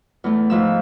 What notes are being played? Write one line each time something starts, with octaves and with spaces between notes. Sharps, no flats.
E2 A3
G#2 F3 E6